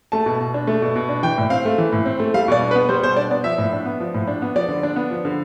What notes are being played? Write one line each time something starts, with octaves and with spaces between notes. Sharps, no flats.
A3 A5
B2
B2
D4
A3
B2
B2
D4
E3 G5
A2
C4 F5
A3
E3
A2
C4
A3
G3 F5
B2 D5
D4
B4
B3
G3 C5
B2 C5
D4 D5
B3 D5
F3 E5
A2
D4
B3
F3
A2
D4
B3
F3 D5
D3
D4
B3
F3
D3